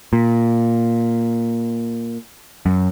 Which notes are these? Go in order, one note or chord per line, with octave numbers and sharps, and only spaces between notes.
A#2
F#2